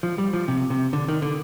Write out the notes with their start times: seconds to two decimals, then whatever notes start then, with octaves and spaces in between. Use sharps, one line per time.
0.03 F3
0.18 G3
0.33 F3
0.48 C3
0.70 C3
0.93 D3
1.08 D#3
1.22 D3